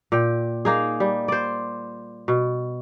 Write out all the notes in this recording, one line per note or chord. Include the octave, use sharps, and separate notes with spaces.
A#2 G5
A#3 D#4 G#4
G3
C5 D5
B2